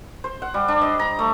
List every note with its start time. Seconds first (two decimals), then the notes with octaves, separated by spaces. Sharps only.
0.24 C5
0.42 F#5
0.54 G3
0.68 D4
0.81 D#5
0.99 A#5
1.19 A3